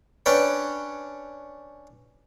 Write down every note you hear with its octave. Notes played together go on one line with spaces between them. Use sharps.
C#4 D4 B4 C#5 G5